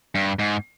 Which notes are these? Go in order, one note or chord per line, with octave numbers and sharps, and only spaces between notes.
G2
G#2